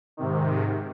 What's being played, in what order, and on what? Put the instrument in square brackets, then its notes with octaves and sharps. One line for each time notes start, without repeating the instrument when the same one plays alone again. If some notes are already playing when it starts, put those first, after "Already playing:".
[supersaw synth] G#2 C3 D#3